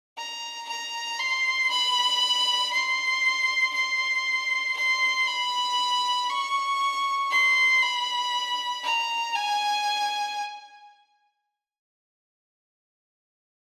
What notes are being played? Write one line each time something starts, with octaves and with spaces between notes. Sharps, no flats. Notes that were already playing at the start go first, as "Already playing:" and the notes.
A#5
A#5
C6
B5
C6
C6
C6
B5
C#6
C6
B5
A#5
G#5